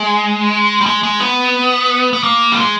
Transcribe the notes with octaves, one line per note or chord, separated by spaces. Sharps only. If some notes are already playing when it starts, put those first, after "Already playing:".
Already playing: G#3
G3
G#3
G#3
B3
B3
A#3
G3
G#3